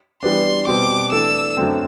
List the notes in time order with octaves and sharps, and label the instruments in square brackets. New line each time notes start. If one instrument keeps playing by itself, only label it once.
[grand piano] E3 G3 B3 D4 [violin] C6
[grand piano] B2 G3 C4 [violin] D6
[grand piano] E3 A3 D4 A4 [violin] E6
[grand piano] F#2 D3 A3 C4